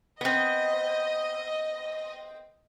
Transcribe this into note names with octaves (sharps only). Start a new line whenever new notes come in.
B3 C4 D#5